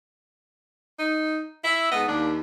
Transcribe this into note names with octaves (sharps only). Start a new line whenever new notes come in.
D#4
E4 E5
G#2 B3 A4 D#5
D#2 D4